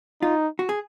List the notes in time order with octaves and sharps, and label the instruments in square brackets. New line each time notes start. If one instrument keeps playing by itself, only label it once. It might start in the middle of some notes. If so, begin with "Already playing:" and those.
[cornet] D#4 [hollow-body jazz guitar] F4
[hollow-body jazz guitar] F#4
G#4